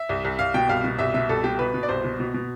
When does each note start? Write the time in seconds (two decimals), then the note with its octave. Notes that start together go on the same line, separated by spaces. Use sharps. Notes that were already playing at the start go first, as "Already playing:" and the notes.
Already playing: E5
0.09 C2
0.25 C2
0.39 C2 F5
0.54 B2 G5
0.69 C2 F5
0.84 B2
0.99 C2 E5
1.14 B2 E5
1.29 C2 A4
1.44 B2 G4
1.59 B2 B4
1.74 B2
1.83 D5
1.89 C2 C5
2.04 B2
2.20 B2
2.34 B2